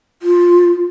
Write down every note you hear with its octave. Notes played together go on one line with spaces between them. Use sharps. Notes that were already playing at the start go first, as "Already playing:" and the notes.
F4